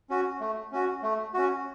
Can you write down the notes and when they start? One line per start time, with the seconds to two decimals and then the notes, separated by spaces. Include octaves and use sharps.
0.10 C#4 F#4
0.40 A3
0.72 C#4 F#4
1.03 A3
1.34 C#4 F#4